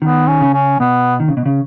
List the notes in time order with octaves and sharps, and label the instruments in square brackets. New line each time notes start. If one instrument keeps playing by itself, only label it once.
[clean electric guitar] D#3 [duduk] B3
[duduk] C#4
[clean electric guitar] C#3
[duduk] C#4
[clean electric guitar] B2 [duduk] B3
[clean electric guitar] D#3
C#3
B2
C#3